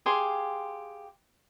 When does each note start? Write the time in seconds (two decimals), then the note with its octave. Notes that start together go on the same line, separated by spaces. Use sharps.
0.06 G4 G#4 F5 C6